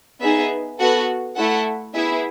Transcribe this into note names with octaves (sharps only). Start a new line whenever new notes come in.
B3 D#4 G#4 E5
B3 F#4 A4 F#5
A3 E4 A4 F#5
B3 E4 G#4 E5